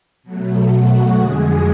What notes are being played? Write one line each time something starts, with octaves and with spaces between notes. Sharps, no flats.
B2 F#3 A3
F#4
F2 D3 G#3 G#4